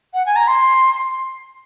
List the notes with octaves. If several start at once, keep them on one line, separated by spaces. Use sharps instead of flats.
F#5
G#5
A#5
C6